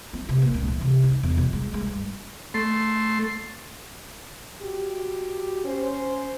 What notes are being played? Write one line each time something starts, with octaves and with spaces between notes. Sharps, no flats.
C4
C3
A#2
C#2
E3
C3
D#4
E2
B2
G#3
G#3
G2
A3 C6
F#4 G4
C#4 C5